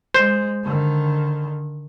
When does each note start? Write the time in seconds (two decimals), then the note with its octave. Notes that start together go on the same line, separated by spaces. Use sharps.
0.15 G#3 C5
0.63 D3 D#3